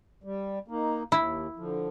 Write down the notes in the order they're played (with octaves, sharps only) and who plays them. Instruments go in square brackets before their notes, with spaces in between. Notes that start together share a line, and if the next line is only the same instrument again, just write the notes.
[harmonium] G3
A#3 D#4
[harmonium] D#2 [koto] E4
[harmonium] D3 F3